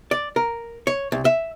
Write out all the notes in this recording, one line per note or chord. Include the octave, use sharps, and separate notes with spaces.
D5
A#4
C#5
C2
E5